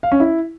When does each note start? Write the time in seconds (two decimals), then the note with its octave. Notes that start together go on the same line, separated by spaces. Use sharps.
0.03 F5
0.12 C#4
0.20 E4